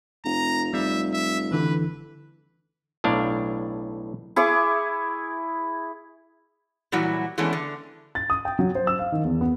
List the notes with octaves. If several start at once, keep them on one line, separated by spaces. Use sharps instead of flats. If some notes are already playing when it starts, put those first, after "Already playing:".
F1 A#5
F1 G3 E5
E5
D3 E3 B4
B1 A2 D4 F5
E4 G#4 C#6 D6
A#2 E3 F#3 G3 E4 F#4
E3 G#3 A3 B3 C#4 D4
D3
A6
D#6
G5
F#3
C5
E6
F5
D#3
E2
B3